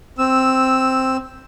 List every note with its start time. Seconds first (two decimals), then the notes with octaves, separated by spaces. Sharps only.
0.18 C4 E6